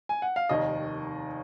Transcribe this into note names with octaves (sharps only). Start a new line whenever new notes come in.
G#5
F#5
F5
F1 D#2 D#3 D#5